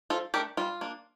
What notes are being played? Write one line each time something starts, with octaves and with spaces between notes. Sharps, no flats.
F3 F4 A4
A3 D4 G4 A#4
G3 F4
A#3 D4